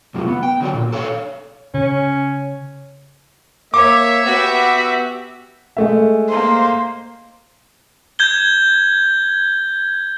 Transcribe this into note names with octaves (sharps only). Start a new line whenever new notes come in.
F#2 C3 F3 G#3
B3
G5
D3 F#3 A3 D5
A#2
A4 C#5 F5
C#3 C#4
A#3 C#5 E5 D6
B3 F#4 G4
G#3 A3 E5
A#3 C5
G6 G#6 G7